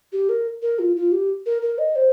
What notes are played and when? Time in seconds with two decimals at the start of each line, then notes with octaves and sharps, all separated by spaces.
0.13 G4
0.29 A#4
0.62 A#4
0.79 F4
0.96 F4
1.12 G4
1.46 A#4
1.62 A#4
1.78 D#5
1.96 C5